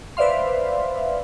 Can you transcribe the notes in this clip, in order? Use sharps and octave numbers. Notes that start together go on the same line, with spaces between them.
B4 C5 D5 E5 F5 C6